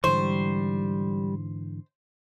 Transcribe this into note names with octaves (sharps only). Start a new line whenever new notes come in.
G#2 D3 E3 G3 C5 C#6